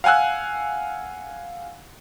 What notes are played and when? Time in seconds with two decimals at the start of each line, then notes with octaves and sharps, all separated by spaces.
0.04 F5 F#5 G#5 E6 F#6